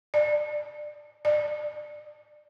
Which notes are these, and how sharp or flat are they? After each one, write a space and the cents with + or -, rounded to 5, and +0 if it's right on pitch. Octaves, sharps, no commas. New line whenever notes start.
D5 +25
D5 +30